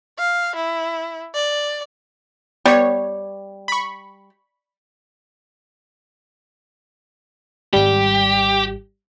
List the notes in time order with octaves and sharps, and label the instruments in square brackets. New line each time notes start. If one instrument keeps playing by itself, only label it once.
[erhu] F5
E4
D5
[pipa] G3 [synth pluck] B3 C#5
[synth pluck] B5 C#6
[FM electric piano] G#1 G3 [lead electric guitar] G4